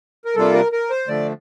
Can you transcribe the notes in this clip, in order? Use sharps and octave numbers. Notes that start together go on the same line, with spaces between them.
A#4
C3 G3 A#3 D4 F4 A4
A#4
A#4
C5
D3 F3 A3 D5